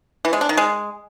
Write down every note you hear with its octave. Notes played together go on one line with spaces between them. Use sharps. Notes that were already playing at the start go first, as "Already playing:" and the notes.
E3
G#3
D4
D#3
G#3